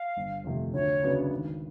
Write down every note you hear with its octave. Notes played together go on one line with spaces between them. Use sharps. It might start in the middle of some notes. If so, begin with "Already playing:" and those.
Already playing: F5
G1
F2 C3 F3 A3
D2 C#5
C#3 F#3 B3 D4
G#1